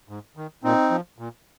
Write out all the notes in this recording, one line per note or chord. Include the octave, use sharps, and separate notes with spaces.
G#2
D#3
A#2 C4 D#4
F3
A#2